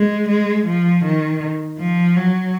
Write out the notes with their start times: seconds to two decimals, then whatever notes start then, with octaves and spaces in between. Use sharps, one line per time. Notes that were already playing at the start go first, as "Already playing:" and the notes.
Already playing: G#3
0.29 G#3
0.66 F3
1.05 D#3
1.79 F3
2.16 F#3